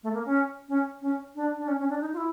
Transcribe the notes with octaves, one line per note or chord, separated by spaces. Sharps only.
A3
A#3
C#4
C#4
C#4
D4
D4
C#4
C#4
D4
D#4
F4
E4